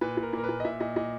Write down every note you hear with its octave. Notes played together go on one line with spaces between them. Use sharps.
A#2 B4
A#2
A#4
A#2 A#4
B4
A#2
D#5
A#2 E5
A#2 D#5
A#2 D#5